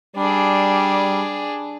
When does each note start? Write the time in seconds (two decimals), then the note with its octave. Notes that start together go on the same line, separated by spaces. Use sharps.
0.16 G3 D4 G#4